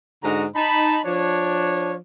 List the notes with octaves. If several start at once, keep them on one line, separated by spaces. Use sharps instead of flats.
G#2 D3 F#4 D#5 A#5
D#4 A5 B5
F3 D4 C#5